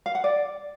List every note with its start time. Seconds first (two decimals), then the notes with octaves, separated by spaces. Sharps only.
0.06 F5
0.15 F#5
0.24 D5